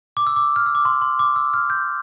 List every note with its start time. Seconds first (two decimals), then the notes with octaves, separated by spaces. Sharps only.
0.17 D6
0.27 E6
0.36 D6
0.56 F6
0.66 E6
0.75 D6
0.85 C6
1.01 C6
1.19 D6
1.36 E6
1.54 F6
1.70 G6